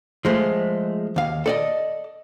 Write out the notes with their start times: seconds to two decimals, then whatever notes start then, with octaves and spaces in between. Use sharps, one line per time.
0.25 F3 G#3 A3
1.16 D#2 F5
1.46 A4 D5 D#5